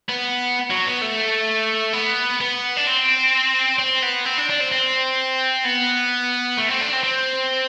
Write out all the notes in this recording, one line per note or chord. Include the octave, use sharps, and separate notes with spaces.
B3
F#3
B3
A3
B3
B3
D4
C4
C4
B3
C4
D4
D4
C4
C4
B3
A3
C4
D4
C4
C4